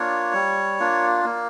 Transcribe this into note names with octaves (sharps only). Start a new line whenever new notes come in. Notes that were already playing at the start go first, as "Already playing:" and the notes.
Already playing: A#3 D4 F4 C#5
G3
A#3 D4 F4
A#3